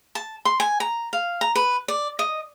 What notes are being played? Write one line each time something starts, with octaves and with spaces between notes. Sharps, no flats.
A5
C6
G#5
A#5
F5
A#5
B4
D5
D#5